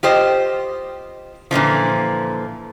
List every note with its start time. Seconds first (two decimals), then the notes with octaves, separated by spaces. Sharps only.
0.03 F4 G4 C5 D#5
1.51 A#2 D3 E3 F3